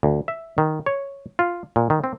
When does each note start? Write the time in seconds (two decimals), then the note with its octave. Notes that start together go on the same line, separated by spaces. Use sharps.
0.03 D2
0.28 E5
0.58 D#3
0.86 C#5
1.39 F4
1.76 A#2
1.90 D#3
2.04 C4